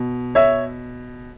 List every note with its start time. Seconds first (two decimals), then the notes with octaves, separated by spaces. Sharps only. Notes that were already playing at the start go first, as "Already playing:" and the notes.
Already playing: B2
0.35 C#5 E5